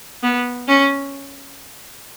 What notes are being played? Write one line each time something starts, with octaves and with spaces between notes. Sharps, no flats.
B3
C#4